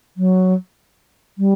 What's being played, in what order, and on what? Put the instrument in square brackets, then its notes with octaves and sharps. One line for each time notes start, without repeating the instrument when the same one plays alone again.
[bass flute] F#3
G3